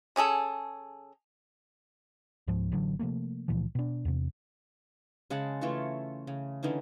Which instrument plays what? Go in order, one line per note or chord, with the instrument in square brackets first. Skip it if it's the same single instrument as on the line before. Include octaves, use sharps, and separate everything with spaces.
[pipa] C#3 C#4 G#4 A4
[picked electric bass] C#2 G#2 F3
A1 A2 D3 F#3
C3 F3 A3 A#3
C#2 A#2 E3 F3
B2 D4
E2 C3
[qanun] C#3 G#3 F#5 A5
E3 A3 F4 C#5
C#3
D3 E3 C#4 D#4